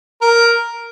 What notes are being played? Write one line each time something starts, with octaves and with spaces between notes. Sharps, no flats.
A#4